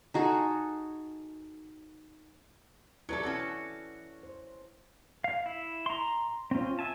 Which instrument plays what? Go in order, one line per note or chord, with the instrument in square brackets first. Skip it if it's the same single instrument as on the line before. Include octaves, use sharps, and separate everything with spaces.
[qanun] D#4 F#4 G#4 A4
[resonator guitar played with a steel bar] F#3 G4 A4 [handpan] E4 B4 D5
[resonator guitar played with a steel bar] C#4 F#4 A4
[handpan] C5
[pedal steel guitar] F5
E4
A#5 C6
C4 C#4 F4
E5 G#5 A5